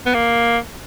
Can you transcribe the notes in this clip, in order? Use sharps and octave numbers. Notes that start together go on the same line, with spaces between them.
B3
A#3